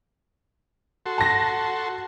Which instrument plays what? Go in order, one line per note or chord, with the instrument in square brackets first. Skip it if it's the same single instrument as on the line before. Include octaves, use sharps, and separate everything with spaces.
[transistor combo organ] F#4 A4 C6
[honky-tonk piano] A5 A#6